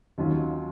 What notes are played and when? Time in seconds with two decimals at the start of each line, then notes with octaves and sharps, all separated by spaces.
0.18 D#2 D#3 F#3 C#4 F4